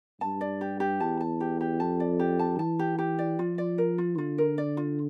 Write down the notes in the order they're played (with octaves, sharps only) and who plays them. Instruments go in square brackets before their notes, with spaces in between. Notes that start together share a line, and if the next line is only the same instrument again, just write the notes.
[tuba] G2 [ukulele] A5
[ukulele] D5
G4
G4
[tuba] E2 [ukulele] A5
[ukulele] A5
G4
G4
[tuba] F2 [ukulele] A5
[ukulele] D5
G4
A5
[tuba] E3 [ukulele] A5
[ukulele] G4
G4
D5
[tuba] F3 [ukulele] F4
[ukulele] D5
A#4
F4
[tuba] D3 [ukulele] F4
[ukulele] A#4
D5
F4